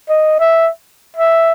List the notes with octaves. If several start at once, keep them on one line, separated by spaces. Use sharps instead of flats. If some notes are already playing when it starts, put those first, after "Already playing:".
D#5
E5
E5